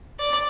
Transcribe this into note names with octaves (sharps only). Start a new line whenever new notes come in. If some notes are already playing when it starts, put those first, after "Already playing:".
D5